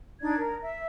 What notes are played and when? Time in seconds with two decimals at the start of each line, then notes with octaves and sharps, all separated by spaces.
0.21 D4 D#4 D5 G#6
0.37 A#4
0.62 E5